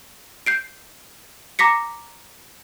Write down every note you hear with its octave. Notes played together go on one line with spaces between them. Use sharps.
G6 C7 D7
A#5 D6 A#6 B6 C#7